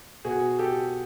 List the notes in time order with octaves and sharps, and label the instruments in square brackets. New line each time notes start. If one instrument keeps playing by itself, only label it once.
[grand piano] B2 F#4 G#4
G4 A4